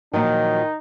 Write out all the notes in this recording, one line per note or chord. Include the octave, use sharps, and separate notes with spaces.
A#2 D#3 F3 F#3 D#4